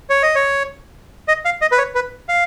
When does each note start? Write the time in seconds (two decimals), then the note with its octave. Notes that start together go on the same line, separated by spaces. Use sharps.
0.10 C#5
0.23 D#5
0.35 C#5
1.28 D#5
1.45 F5
1.62 D#5
1.72 B4
1.78 C#5
1.95 B4
2.29 F5